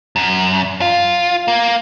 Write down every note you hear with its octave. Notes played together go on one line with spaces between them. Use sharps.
F#2
F4
A#3